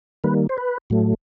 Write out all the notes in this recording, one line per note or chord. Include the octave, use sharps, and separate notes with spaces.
D#3 G3 A#3 B4
C5
B4
A2 F#3 A3